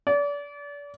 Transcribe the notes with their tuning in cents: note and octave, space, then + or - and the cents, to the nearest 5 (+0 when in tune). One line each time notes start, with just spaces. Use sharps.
D5 -35